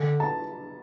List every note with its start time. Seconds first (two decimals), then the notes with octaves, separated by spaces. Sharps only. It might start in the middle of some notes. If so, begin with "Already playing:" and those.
Already playing: D3
0.20 A5